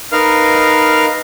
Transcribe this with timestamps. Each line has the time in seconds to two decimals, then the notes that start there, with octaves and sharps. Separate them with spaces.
0.12 D#4 A#4 B4 F5 F6